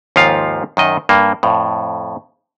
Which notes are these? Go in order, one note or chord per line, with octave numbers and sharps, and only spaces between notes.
D#2 G#2 F3 F4 F5
F#2 D#3 D#5
G2 A#3
F2 A2